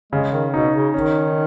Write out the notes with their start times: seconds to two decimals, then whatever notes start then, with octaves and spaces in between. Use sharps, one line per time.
0.13 C#3 G#3
0.32 D#3
0.54 B2 D#4
0.74 C#3
0.94 D#3 C#4